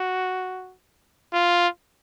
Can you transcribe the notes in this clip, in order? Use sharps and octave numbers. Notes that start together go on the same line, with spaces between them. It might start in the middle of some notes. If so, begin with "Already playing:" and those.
Already playing: F#4
F4